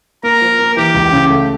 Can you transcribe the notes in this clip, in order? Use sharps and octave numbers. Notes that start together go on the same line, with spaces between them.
A#3 A#4
F3
A#3
E3 G4
C#2
C#3
A3